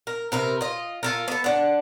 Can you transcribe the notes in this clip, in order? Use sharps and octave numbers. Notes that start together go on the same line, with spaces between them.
A#4
C3 A#4 B4
F4 D#5
F4 A4 A#4
B3 A4
D4 F#5